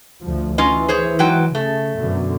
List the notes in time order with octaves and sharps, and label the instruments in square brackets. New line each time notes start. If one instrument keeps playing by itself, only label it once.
[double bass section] D2 F3
[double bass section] E3 [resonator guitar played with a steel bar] C#4 F4 D#5
[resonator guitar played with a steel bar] G#4 C5 C#5
G#2 F#3 G5
[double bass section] C#3 [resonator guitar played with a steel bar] A3
[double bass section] F#2 B2 D3